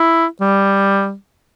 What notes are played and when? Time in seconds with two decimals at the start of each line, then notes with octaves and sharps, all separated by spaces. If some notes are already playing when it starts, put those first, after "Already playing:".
Already playing: E4
0.40 G3